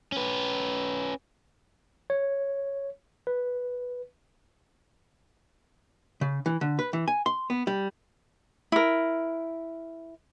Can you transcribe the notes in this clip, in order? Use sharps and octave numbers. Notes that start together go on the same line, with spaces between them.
C#4 B4
C#5
B4
C#3
E3
D3
B4
E3
G#5
C6
B3
G3
E4 A#4